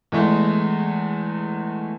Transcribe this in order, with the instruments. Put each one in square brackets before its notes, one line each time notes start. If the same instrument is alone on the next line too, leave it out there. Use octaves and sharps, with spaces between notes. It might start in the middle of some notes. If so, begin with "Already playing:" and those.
[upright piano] E2 G#3 A3